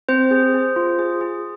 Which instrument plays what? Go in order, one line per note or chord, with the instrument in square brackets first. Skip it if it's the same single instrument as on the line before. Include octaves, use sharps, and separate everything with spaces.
[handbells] C4 C5
G#4
G#4
F4
G#4
G#4